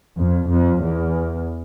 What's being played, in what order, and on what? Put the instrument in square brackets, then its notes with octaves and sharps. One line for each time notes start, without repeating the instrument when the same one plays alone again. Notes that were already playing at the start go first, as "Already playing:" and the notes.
[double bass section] F2
F2
E2